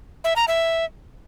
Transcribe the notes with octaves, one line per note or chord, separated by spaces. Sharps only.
E5
A#5
E5